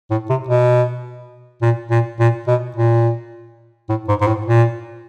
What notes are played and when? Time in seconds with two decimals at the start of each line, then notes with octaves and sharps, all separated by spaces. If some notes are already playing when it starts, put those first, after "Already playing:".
0.10 A2
0.29 C3
0.49 B2
1.62 A#2
1.90 A#2
2.19 A#2
2.47 B2
2.76 A#2
3.89 A2
4.08 G#2
4.21 G#2
4.27 A2
4.46 A#2